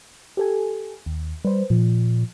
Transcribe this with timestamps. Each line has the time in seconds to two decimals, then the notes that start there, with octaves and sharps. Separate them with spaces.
0.37 G4 A4 G#5
1.06 D#2
1.45 G3 B4 C5
1.70 A#2 F3